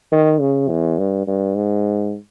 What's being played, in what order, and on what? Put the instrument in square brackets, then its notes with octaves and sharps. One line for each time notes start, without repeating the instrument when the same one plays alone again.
[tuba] D#3
C#3
E2
G2
G2
G#2